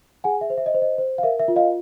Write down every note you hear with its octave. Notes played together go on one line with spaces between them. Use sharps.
G#4 F#5 G#5
E5
C5
E5
D#5
C5
D#5
C5
F5
A#4 E5
E5
F4
D#5 F5